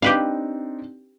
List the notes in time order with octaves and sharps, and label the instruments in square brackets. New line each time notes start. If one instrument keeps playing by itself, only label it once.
[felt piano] C4 D4 D#4 [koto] G4 B4 F5